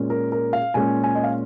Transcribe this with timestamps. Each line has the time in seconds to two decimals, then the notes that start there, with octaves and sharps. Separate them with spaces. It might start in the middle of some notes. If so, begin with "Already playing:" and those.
Already playing: A#2 G#3 C#4
0.10 A#4
0.32 A#4
0.53 F5
0.74 A#2 G#3 C#4 G#5
1.03 G#5
1.15 D#5
1.24 F5